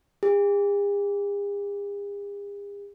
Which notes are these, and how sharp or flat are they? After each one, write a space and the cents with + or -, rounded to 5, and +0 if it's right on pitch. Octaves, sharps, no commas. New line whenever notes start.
G#4 -45